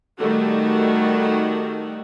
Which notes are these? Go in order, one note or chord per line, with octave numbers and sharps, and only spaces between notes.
D#3 G3 A3 F#4 A4